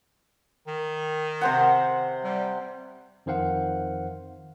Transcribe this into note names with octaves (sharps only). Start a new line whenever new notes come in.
D#3
C3 C5 F#5
G3
F2 D#3 C5 F5 F#5